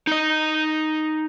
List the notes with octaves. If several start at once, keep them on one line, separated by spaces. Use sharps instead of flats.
D#4 D#5